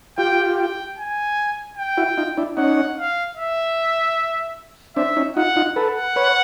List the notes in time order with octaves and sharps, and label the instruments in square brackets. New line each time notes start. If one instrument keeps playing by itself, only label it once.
[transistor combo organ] F4 G4 [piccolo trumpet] G5
[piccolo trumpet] G5
G#5
G5
[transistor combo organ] E4 F#4
D#4 F4
D4 E4
[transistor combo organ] C#4 D#4 [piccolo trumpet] F#5
[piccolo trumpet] F5
E5
[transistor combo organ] C4 D4 [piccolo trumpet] E5
[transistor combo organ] C#4 D#4
[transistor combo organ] D#4 F4 [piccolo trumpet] F#5
[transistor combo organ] D#4 F4
[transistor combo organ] A4 B4 [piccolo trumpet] F#5
[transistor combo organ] B4 C#5